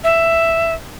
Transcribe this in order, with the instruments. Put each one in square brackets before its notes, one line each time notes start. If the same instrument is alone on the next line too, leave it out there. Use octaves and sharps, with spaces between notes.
[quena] E5